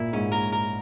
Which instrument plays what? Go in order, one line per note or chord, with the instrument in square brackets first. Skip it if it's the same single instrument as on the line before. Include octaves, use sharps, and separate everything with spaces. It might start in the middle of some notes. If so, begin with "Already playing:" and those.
Already playing: [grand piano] A#2 [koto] E4
[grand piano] G#2 [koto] C#4
[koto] A#4
A#4